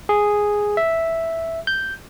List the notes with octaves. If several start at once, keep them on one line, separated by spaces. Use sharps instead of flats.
G#4
E5
G6